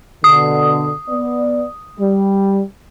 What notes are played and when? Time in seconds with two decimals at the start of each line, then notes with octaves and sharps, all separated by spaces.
0.24 B2 D3 D#6
1.09 B3 D5
2.00 G3